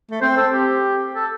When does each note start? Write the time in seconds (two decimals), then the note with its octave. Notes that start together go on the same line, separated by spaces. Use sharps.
0.11 A3
0.22 C4 C5
0.38 A4
0.53 G4
1.15 A4